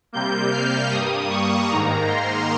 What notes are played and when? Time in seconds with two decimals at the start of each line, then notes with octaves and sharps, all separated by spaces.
0.13 C3 G3 A#3 G6
0.52 F6
0.91 G2 G3 A#3 D#6
1.30 C#6
1.69 G#2 D#3 A#3 A#5
2.08 C6